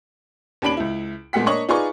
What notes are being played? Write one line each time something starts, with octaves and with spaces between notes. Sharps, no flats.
D#2 C#4 D4 B5 D7 F#7
C#2 E4
A#2 G#3 A3 B3 F#5 B6
A#3 D4 C#5 D#5 C#6 F#7
D#4 F4 G#4 B4 D5 C#6